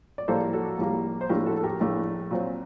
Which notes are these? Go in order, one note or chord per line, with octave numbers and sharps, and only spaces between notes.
D5
A#1 A2 G3 A#3 A4 C5
F#4 A4
A#1 A2 G3 A#3
C5
A#1 A2 A3 D4 G4 A#4
F#4 A4
A4
G4 A#4
A#1 A2 A3 D4
A#2 F#3 C4